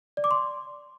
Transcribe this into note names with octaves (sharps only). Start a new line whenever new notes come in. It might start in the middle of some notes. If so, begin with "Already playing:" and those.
D5
D6
C6